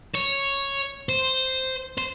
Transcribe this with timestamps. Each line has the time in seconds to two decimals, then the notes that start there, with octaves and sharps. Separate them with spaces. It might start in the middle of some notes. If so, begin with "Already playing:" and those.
0.15 C#5
1.09 C5
1.98 C5